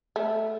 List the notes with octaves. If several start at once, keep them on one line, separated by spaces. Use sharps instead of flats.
A3